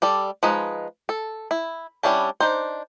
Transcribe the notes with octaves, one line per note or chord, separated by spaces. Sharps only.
G3 A4 D5
F3 G#3 D#4 B4
A4
E4
G3 C#4 D4 E4 A5
D4 D#4 C5